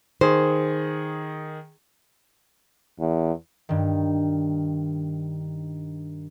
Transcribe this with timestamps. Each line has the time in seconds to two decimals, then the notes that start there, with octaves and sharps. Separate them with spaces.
0.21 D#3 G#4 C5
3.00 E2
3.69 G2 D#3